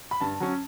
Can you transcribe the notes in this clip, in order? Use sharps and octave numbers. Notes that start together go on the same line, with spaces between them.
B5
G2 A5
F#3 C#4